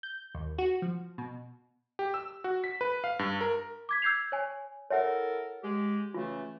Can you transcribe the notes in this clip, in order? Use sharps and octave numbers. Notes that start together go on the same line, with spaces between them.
G6
D#2
F#4
F3
B2
G4
E6
F#4
B6
B4
F5
G2
A#4
D6 G#6 B6
E6 G6 G#6 C7 F7
C#5 G#5
E4 A4 A#4 C#5 E5 F#5
G#3 G4
C#3 E3 A3 F4